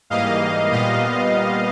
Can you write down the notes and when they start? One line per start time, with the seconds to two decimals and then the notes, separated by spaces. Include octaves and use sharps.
0.10 G#2 E3 G3 A#3 D#5 F5
0.71 A#2 G3 B3 D#5 F5